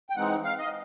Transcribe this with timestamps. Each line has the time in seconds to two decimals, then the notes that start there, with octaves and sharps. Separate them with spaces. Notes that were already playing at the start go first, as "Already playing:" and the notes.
0.10 G5
0.16 E3 G#3 C4 D#4 F#5
0.44 F5
0.59 D#5